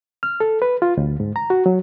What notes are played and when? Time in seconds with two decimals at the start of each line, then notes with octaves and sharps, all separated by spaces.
0.23 F6
0.40 A4
0.62 B4
0.82 F4
0.97 D2
1.20 G#2
1.36 A#5
1.50 F#4
1.66 F#3